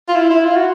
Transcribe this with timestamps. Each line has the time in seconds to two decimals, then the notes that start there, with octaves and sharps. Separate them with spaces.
0.08 F4
0.16 E4
0.30 E4
0.45 F4
0.56 F#4